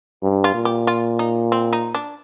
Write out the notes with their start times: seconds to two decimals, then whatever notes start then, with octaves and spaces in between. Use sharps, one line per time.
0.23 G2
0.44 F4
0.54 A#2
0.65 G4
0.87 F4
1.19 D#4
1.52 C4
1.73 D#4
1.94 D4